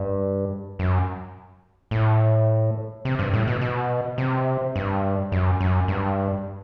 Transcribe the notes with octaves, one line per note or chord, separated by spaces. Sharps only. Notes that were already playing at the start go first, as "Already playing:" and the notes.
Already playing: G2
F#2
A2
C3
G2
A2
B2
B2
C3
G2
F#2
F#2
G2